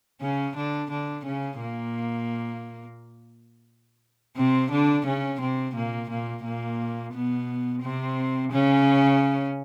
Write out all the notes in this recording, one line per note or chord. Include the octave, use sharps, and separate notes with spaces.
C#3 C#4
D3 D4
D3 D4
C#3 C#4
A#2 A#3
C3 C4
D3 D4
C#3 C#4
C3 C4
A#2 A#3
A#2 A#3
A#2 A#3
B2 B3
C3 C4
C#3 C#4